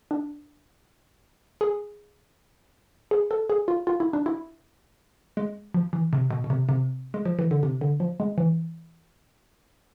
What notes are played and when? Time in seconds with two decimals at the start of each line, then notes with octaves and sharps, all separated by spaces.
0.11 D4
1.61 G#4
3.11 G#4
3.31 A4
3.50 G#4
3.68 F4
3.87 F4
4.00 E4
4.13 D4
4.26 E4
5.37 G#3
5.74 F3
5.93 E3
6.13 C3
6.31 B2
6.44 B2
6.50 C3
6.69 C3
7.14 G#3
7.25 F3
7.39 E3
7.51 D3
7.63 C3
7.81 D3
8.00 F3
8.20 G#3
8.38 E3